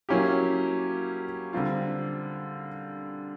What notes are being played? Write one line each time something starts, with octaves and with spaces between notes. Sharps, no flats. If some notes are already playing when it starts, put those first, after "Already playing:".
F#3 A#3 C#4 E4 G4
D3 G3 C4 F4